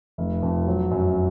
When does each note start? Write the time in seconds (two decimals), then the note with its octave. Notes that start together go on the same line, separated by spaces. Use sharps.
0.18 F1
0.42 F2
0.67 F#3
0.91 F#2